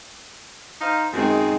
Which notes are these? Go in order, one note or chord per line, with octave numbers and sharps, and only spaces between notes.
D#4 C5 F5
F#2 D#3 G#3 C4 D#4 G#4